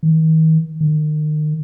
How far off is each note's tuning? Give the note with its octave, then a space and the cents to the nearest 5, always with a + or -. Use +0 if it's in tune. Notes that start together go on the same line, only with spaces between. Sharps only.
D#3 +40
D#3 -35